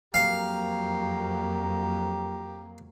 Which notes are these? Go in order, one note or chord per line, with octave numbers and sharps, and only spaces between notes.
F2 F#3 A#3 G4 F5 A#5